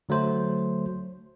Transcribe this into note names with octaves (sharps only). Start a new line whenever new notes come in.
D3 F#3 A3 C5